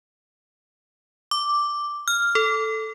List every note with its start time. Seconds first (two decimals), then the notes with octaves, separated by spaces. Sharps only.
1.31 D6
2.08 F6
2.35 A4